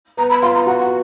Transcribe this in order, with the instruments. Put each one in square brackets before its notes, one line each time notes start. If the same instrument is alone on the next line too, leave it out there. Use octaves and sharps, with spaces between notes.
[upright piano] B3 [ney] A#5
[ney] B5
[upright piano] F4 [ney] C6
[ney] A#5
[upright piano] F#4 [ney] F#5
[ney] F#5